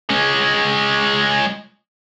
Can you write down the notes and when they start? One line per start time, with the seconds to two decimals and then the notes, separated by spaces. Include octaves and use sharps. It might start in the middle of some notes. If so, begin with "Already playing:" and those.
0.10 G#3 C#4